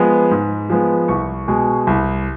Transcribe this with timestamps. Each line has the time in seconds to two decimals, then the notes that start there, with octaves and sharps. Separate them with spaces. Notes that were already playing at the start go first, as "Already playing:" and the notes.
Already playing: F3 G#3 B3
0.31 G#2
0.70 F3 G#3 B3
1.08 C2 C#6
1.48 B2 G#3
1.87 C2